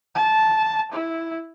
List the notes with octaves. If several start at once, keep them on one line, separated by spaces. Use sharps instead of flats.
A5
E4